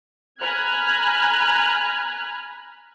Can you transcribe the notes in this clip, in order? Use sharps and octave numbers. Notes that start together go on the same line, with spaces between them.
G#5 A#5 B5 F6 F#6 G#6